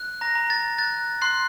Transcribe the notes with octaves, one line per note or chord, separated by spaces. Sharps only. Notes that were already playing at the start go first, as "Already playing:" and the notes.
Already playing: F#6
A#5 A#6
A#5
A6
F#6 A6
C6 F#6 C7